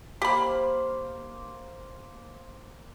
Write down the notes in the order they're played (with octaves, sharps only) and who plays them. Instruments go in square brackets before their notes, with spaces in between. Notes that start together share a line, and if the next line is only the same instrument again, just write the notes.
[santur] A#3 C5 F5 [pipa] G4 B5